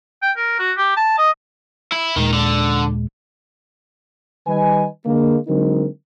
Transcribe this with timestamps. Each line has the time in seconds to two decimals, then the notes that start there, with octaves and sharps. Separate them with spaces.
0.22 G5
0.37 A#4
0.59 F#4
0.78 G4
0.97 A5
1.18 D#5
1.92 E4
2.16 D#2 A#2 D#3 G#3
2.33 D3
4.47 D#3 G3 B4 D#5 G#5
5.06 D3 G#3 A#3
5.47 D3 F#3 G#3 C4 D#4 A#4